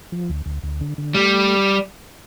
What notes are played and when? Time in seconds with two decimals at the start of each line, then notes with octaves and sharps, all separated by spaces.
0.12 F3
0.29 D2
0.46 D2
0.63 D2
0.81 D3
0.98 D3
1.15 G3 A3